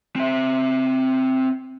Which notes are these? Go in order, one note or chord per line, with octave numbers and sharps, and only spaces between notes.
C4 E5